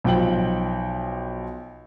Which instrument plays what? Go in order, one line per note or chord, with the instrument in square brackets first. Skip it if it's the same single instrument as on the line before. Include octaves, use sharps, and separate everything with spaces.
[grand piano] B1 F3 G5 F#7